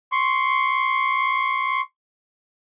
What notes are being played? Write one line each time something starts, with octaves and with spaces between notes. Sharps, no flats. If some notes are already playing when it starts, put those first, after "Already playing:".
C6 C#6